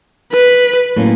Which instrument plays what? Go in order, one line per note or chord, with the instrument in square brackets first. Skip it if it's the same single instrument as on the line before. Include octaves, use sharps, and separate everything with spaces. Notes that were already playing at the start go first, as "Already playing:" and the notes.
[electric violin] B4
[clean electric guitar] A2 F#3 A#3 C#4